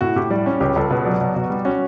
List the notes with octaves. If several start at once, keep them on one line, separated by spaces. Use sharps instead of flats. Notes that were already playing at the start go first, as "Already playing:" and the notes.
A2 F#4
A2 G4
G3 D5
C#4
C#2 G4
C#2 A4
B2 B4
F#3 D5
B2 D5
B2 F#4
G3 F#4
C#4 F#4